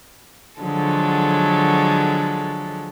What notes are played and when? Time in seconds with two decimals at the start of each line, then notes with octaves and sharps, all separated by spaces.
0.62 D3 F3 F#3 G#3 A4